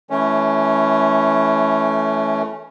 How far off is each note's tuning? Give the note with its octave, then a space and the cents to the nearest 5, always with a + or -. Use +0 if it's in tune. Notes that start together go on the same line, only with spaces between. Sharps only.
E3 +0 A3 -25 C#4 +0